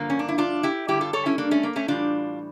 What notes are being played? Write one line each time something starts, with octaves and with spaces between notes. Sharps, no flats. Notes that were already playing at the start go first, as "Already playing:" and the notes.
Already playing: G2 D3 F3 A#3
C#4
D4
E4
D4 F4
E4 G4
G2 D3 G3 E4 G4
F4 A4
A4 C#5
C#4 E4
A#3 D4
A3 C#4
A#3
A3 C#4
A2 E3 G3 D4 F4